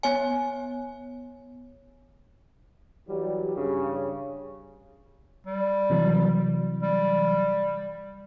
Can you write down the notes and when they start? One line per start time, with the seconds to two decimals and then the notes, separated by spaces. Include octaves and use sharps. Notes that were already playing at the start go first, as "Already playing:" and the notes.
0.03 B3 C#5 G#5
3.09 E3 F#3 G3
3.56 G2 C#3
5.46 G3
5.90 C3 E3 F#3
6.82 G3